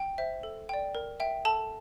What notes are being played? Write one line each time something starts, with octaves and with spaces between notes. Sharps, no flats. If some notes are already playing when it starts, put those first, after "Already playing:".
Already playing: G5
C5 E5
A4
D5 G5
A#4
E5 G5
A4 A5